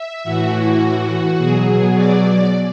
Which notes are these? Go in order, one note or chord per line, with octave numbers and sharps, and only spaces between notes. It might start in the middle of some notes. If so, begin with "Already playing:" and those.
Already playing: E5
A2 E3 F#4
B2 F#3 G#4
D5
D5